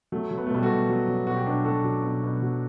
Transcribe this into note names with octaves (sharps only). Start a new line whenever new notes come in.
F#3 A3
F#3
B3
A3
B2 G3 B3
F#4 A4
B2
F#3
F#3
B2 F#4
G4
B2 D4 F#4
F#3 F#4 A4
F#3
B2
B2
F#3